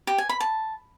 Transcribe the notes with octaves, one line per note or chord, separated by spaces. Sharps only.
G4
G#5
B5
A5